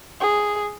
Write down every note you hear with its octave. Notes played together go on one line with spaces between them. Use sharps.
G#4